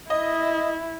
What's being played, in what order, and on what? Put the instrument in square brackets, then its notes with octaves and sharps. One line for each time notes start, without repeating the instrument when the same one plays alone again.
[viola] E4 [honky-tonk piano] D#5